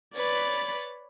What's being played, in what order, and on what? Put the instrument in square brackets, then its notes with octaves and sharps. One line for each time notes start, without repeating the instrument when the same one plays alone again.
[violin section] B4 C#5 A6 [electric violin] D5 B5